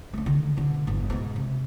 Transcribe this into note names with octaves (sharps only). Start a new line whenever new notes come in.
A3 D4
D3 D#3
B2 D3
G1 E2
G#2 B2
C3